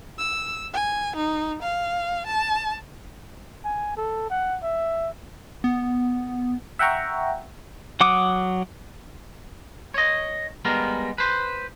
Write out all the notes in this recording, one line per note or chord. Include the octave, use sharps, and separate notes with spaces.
E6
G#5
D#4
F5
A5
G#5
A4
F#5
E5
B3
E5 F#5 G5 A#5 C#6
F#3 F#5 D6 D#6
C#5 D#5
G3 G#3 B3 A#4
B4 C5